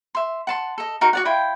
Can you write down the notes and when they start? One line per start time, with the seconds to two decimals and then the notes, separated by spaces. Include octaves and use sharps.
0.15 E5 C6
0.47 F#5 A5 C6
0.78 A4 D#5
1.01 D#4 F#4 A#4
1.13 F#4 D5 F#5
1.25 E4 F4 G5